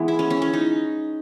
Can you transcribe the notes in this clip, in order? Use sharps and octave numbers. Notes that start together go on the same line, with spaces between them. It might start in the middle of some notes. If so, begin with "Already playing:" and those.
Already playing: E3 G#3 B3
E4
C#4
C#4
C#4
D#4